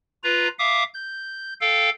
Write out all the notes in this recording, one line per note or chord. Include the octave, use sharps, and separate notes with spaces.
F4 B4 A#5
E5 F5 D6 D#6
G6
A4 F5 G5